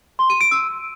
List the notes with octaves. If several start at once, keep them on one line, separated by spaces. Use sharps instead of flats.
C6
D#7
D7
E6